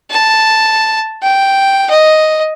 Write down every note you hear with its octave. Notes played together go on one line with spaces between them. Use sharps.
A5
G5
D#5